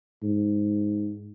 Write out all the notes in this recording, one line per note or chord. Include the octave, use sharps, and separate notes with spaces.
G#2